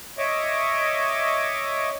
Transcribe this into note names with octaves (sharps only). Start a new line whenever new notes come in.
C#5 D#5 E5 D6